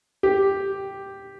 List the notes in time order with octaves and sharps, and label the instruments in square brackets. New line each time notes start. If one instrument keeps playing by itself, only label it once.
[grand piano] G4